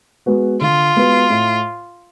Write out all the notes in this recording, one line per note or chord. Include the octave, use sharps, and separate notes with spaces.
G#3 B3 F#4 B4
D3 F4
G#3 B3 F#4 B4
A2